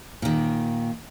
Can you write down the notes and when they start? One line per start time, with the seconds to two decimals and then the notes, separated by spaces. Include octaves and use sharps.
0.22 A#2 D#3